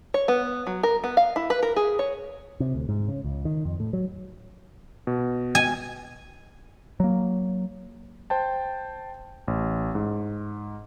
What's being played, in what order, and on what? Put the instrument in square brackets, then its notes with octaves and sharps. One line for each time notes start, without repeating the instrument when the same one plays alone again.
[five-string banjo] C#5
B3
F#3
A#4
B3
F5
E4
B4
A#4
G#4
C#5
[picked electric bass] C3
D2
G#2
C#3
C#2
D#3
F2
A2
F#3
[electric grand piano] B2
[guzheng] G#5
[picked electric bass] F#3 A#3
[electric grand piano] C5 G5 A5
A1
G#2